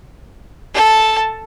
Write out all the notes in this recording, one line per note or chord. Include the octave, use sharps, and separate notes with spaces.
A4 A5